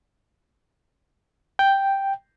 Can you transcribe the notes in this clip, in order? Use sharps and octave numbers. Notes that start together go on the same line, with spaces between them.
G5